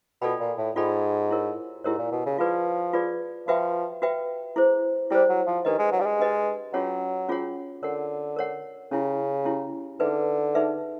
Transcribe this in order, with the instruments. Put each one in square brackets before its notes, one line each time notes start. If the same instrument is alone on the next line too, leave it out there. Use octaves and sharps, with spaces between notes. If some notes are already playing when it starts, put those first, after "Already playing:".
[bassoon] B2 [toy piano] F4 A4 D5 G5 B5
[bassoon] A#2
A2
[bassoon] G#2 [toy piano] F4 A4 D5 G5 B5
[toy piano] E4 G4 A#4 C#5
[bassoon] G#2 [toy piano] E4 G4 A#4 C#5
[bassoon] A#2
B2
C#3
[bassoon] F3 [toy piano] F4 G#4 B4 D5
[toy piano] F4 G#4 B4 D5
[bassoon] F3 [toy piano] F#4 B4 E5 G5
[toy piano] F#4 B4 E5 G5
E4 G#4 C5
[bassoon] G3 [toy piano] E4 G#4 C5
[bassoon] F#3
F3
[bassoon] D#3 [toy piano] D4 G4 B4 D#5
[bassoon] G#3
F#3
G3
G#3
[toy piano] D4 G4 B4 D#5
[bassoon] F#3 [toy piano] C#4 F4 G#4 C#5 F#5
[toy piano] C#4 F4 G#4 C#5 F#5
[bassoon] D3 [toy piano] A#4 C#5 F#5
[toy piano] A#4 C#5 F#5
[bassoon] C#3 [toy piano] C#4 E4 G4
[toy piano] C#4 E4 G4
[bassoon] D3 [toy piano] D#4 G#4 B4 E5
[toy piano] D#4 G#4 B4 E5